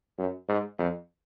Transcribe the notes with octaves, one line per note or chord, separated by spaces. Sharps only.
F#2
G#2
F2